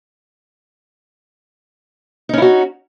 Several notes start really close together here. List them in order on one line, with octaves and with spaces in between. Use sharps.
D#4 C#4 E4 F#4